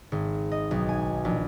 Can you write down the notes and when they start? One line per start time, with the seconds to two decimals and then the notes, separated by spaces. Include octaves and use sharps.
0.12 G#1
0.52 D#5
0.71 B1
0.89 G#5
1.25 A#1